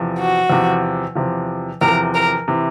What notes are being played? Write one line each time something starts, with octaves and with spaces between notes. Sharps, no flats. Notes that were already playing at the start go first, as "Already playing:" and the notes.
Already playing: E2 C3 F3
F#4
E2 C3 F3
E2 C3 F3
E2 C3 F3 A#4
A#4
C3 E3